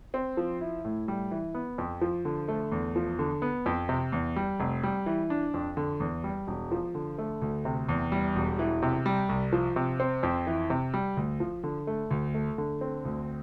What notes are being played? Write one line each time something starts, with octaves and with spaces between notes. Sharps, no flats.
C4
F3
E4
A2
G3
E3
B3
F2
F3
D3
A3
E2
F3
D3
B3
F2
C3
E2
G3
F1
G3
E3
D4
F2
D3
E2
G3
E1
F3
D3
A3
D2
C3
E2
G3
E1
E3
C3
G3
C2
F3
C3
C4
F2
E3
C3
G3
D2
F3
D3
A3
D2
A3
D3
C4
D2